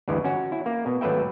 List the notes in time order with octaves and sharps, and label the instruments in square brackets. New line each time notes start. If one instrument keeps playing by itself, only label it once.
[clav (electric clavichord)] D2 G2 E3 G#3
C#4 F#4
E4
A#3
B2
G#1 F#3 A3 B4 E5 G5